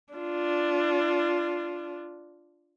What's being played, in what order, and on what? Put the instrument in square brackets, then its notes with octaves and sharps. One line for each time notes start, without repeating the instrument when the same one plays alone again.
[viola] D4 F4